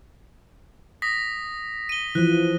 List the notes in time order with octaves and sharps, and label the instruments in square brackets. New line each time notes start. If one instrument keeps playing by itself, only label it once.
[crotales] D#6 A#6 B6
D#7 G7
[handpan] E3 F3 [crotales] F#6